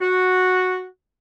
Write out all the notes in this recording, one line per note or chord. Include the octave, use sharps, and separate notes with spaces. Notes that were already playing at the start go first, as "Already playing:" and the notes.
F#4